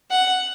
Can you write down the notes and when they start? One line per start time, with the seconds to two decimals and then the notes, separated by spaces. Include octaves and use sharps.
0.11 F#5